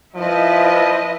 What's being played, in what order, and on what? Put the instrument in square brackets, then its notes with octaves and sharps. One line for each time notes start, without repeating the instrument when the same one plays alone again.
[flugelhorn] F3 [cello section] E4 B4 D#5